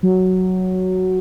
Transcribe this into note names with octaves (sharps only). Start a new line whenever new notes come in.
F#3